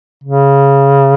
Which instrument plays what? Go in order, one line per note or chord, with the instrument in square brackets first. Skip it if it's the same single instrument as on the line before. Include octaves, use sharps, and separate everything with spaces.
[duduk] C#3